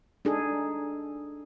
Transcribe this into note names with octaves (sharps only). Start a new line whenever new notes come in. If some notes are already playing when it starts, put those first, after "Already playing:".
D4 D#4 G#4 A4